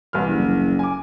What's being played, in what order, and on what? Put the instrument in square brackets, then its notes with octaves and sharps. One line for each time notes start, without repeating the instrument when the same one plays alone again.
[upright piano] C2 E3 F6
[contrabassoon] F#1
[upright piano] G#5 D6